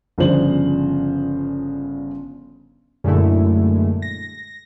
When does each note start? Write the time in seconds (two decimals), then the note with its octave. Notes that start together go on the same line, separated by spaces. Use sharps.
0.18 G1 C#3 F3 D4 C5 F#7
3.04 F#2 A#2 D3 G#3 A3 E4
4.02 A#6